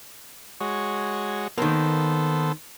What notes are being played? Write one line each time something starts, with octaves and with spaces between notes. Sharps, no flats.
G#3 F#4 C#5
D#3 A#3 B3 A4 C5